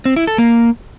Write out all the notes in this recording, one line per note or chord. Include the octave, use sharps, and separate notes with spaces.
C4
E4
A4
A#3